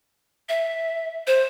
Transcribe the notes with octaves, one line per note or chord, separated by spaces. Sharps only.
E5
C5